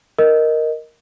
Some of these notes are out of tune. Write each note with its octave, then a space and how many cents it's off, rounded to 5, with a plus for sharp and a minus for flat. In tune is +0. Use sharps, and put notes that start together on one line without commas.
A#4 +0 D#5 +0